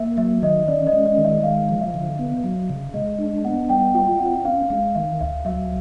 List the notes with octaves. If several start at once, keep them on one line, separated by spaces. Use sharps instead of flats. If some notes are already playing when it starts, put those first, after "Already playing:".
Already playing: A#3 E5
F#3 E5
D#3 D#5
C#4 D5
D#5
G#3
D#5
D#3
E5
G#3 F5
F3
E5
D3
B3
F#3
C#3
G#3 D#5
D4
B3 F#5
G3 G5
F4 G5
C4 F#5
C#4 F5
G#3 F5
D#3 E5
D2 E5
F#3 E5